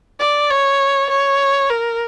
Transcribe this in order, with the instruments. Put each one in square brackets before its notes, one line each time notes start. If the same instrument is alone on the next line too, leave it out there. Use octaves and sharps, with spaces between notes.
[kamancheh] D5
C#5
C#5
A#4